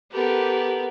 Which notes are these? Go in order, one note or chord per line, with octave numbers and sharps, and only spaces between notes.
B3 G4 A4 A#4